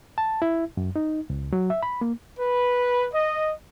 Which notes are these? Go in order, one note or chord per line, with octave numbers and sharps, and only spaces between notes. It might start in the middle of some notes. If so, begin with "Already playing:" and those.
A5
E4
F#2
D#4
C#2
F#3
E5
B5
A#3
B4
D#5